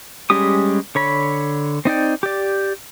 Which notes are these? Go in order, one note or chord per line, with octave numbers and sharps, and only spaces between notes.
G3 G#3 C#4 G4 D#6
D3 C#5 B5
C4 D#4 D5 G5
G4 D5